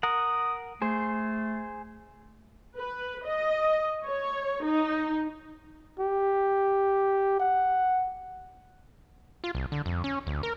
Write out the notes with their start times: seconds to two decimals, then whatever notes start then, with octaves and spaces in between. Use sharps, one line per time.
0.03 A#4 F#5 D#6
0.82 A3 G#4 C5
2.77 B4
3.24 D#5
4.05 C#5
4.64 D#4
5.99 G4
7.39 F#5
9.44 F4
9.55 C2
9.72 D3
9.86 F2
10.04 C#4
10.27 D2
10.43 A#4